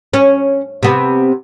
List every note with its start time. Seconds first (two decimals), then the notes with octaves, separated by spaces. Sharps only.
0.14 C#4
0.83 C3 B3